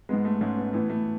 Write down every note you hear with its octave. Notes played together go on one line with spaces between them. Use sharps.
G#2 G#3 B3
A3
G#2 G#3 A3 C#4
B3
A2 E3 A3 B3
A3